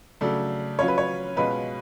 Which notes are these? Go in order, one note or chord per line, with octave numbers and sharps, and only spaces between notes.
C#3 F#3 A3 D4
F#3 C#4 F4 C#5
B4
C#5
B2 G#3 C#4 F4 B4